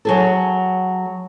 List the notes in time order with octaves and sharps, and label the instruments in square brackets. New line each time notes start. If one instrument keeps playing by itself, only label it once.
[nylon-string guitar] F#3 G#4 A4